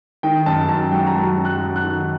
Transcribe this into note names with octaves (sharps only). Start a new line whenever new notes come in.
D#3 G5
F#2 A5
F#2 A5
F#3 G5
A#5
F#3 A5
F#2
F#6
F#3
F#6
D#3